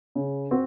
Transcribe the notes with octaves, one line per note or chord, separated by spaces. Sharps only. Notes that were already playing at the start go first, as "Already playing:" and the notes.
C#3
C4 F#4